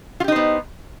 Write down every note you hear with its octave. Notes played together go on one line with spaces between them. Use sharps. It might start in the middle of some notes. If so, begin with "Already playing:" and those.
B3 D#4 F4 G4 C5